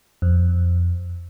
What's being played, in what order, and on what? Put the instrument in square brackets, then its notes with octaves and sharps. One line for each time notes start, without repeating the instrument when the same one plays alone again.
[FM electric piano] F2